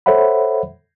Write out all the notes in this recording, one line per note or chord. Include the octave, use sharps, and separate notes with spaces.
A4 C5 C#5 E5 F#5 B5